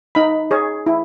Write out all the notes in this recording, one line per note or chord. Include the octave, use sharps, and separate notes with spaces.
D#4 B5
G#4 C#5
E4